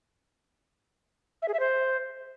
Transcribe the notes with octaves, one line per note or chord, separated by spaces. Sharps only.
E5
G#4
E5
C5